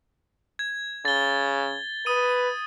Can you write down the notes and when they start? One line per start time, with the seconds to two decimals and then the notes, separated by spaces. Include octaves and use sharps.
0.59 G#6
1.05 C#3 A6 G7
2.06 B4 D#6 D#7